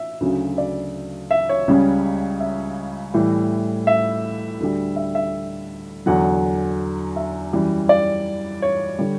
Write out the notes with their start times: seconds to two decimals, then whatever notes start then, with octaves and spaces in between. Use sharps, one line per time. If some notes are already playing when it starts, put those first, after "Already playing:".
Already playing: E5
0.20 D2 C#3 F#3
0.58 D5
1.31 E5
1.49 C#5
1.68 C#2 C#3 G3
2.40 E5
3.14 A2 E3 G3
3.87 E5
4.60 D2 D3 G3
4.96 E5
5.15 E5
6.06 E2 D3 F#3 F#5
7.16 E5
7.53 F#2 E3 G3
7.89 D5
8.62 C#5
8.99 D3 G3